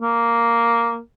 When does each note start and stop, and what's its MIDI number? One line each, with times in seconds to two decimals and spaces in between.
0.01 1.00 58